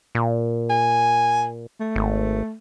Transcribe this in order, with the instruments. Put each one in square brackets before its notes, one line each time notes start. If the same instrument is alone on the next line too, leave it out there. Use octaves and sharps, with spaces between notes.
[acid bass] A#2
[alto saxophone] G#5
A3
[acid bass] G#1